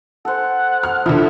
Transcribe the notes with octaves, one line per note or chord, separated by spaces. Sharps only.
A4 C5 F#5
F6
D3 F3 E4